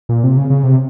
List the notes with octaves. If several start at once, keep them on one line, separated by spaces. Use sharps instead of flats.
A#2
C3
C#3
C#3
C3